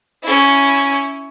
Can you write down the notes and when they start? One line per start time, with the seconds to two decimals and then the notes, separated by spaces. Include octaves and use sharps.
0.23 C#4 E4